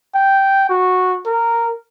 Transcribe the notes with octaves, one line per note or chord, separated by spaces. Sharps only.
G5
F#4
A#4